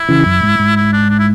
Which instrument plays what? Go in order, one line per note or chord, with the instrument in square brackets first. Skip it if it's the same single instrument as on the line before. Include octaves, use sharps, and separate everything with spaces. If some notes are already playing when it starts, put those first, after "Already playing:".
Already playing: [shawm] E4
[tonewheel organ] C#3 E3
F#2
G#2
G#2
[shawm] E4
D4
D4
E4